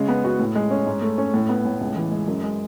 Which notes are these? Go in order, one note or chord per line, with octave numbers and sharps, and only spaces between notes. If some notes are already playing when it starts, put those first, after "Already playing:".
Already playing: C#3 G#3
B3
F#4
A2
G#3
C#4
G#2
A3
C#4
A2
B3
A2
C#2
E3
G#3
F#2
G#3